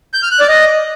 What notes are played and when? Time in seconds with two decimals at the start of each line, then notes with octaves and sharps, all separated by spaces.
0.14 G6
0.23 F6
0.31 F#6
0.40 D5
0.49 D#5